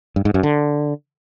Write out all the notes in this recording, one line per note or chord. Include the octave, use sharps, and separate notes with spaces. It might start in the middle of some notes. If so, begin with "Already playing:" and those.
G2
G#2
F#2
D3